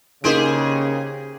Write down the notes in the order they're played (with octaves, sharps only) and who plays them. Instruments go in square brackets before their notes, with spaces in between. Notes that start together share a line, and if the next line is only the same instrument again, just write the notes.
[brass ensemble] C#3 [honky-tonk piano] A#3 D#4 D7 [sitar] G4 G#4 C5